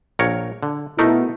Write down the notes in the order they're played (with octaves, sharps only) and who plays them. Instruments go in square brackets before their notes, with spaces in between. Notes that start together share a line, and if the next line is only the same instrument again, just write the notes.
[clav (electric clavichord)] A#1 A#4 C#5
D3
[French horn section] B2 E4 [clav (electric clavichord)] A3 D#4 A#4